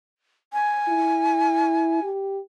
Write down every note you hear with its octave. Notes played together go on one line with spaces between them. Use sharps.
G#5
E4
G4